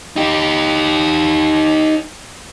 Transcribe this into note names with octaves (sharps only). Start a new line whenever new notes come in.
D#4 G4